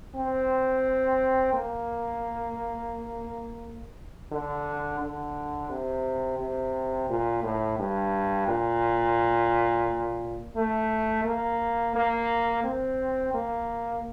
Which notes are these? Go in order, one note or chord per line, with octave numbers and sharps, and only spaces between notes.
C4
A#3
D3
D3
C3
C3
A#2
A2
G2
A#2
A3
A#3
A#3
C4
A#3